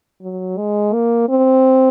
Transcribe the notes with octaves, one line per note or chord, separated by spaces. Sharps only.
F#3
G#3
A#3
C4